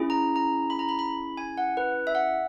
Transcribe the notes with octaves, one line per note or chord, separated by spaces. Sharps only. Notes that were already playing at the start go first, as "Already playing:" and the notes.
Already playing: C#4 E4 G#4
A#5
A#5
B5
A#5
B5
B5
G#5
F#5
B4
E5
F#5